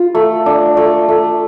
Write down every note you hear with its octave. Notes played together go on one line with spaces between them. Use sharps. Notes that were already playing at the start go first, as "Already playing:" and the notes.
Already playing: F4
A3
D4
A3
A3